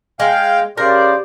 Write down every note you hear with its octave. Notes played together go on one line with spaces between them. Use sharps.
G#3 F5 G5
C#3 G4 A#4 C5 D5